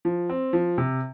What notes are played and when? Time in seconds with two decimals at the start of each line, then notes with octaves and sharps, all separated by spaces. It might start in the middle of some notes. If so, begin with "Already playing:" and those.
0.05 F3
0.30 C4
0.53 F3
0.78 C3